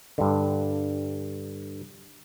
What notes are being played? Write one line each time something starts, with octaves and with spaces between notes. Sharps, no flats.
G2 D3